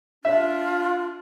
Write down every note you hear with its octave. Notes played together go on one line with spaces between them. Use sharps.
D4 F4 E5